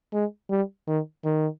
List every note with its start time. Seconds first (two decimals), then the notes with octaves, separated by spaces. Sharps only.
0.13 G#3
0.50 G3
0.88 D#3
1.25 D#3